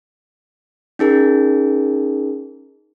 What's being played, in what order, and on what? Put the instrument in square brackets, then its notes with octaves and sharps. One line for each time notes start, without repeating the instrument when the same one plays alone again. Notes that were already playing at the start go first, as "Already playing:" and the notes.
[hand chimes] C#4 D#4 G#4 A#4